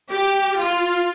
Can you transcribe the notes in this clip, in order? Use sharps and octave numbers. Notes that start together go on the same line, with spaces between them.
G4
F4